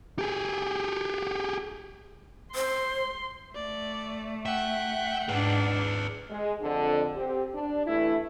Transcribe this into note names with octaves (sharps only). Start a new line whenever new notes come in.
G4 G#4
C5 C6
A3 D5
E5 F#5 G5
G#2 D4 G#4 B4
G#3
F2 D3
C4 G4
D4
G2 E3 A3 E4